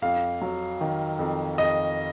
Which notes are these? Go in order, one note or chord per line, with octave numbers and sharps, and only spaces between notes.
F2 F5
F#3
D#3
F2
F2 D#5